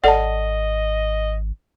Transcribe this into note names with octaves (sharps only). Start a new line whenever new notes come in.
G#1 A4 D5 D#5 F#5 A5